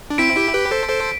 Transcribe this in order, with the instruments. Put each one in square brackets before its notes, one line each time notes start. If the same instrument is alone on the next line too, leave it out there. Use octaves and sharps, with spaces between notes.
[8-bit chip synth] D4
[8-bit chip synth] C4 E4 [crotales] B6 D7
[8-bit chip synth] E4 G4
G4 B4
A4 C5
A4 C5